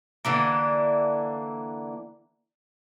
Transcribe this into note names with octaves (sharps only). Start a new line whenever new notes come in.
D3 E3 A#3